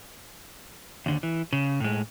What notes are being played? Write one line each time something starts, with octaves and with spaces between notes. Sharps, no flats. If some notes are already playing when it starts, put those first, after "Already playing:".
D#2 D3
E3
C#3
A2 G#3